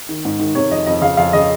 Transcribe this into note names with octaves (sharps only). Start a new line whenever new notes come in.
D#3
G#2
D#3
C3 C#5
F2 D#5
F2 D#5
C#3 F5
F2 F5
C#3 D#5